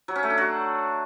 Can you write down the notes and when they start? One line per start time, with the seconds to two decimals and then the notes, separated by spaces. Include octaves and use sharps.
0.08 F#3
0.16 C#4
0.23 A3
0.30 D4
0.38 F#4